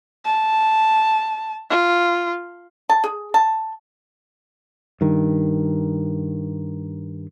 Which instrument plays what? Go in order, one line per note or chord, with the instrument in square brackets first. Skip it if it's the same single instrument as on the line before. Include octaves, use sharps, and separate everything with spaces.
[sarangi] A5
F4
[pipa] A5
G#4
A5
[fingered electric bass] G2 D#3